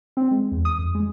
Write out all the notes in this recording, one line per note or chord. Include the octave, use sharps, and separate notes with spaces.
C4
G#3
E2
D#6
F2
G#3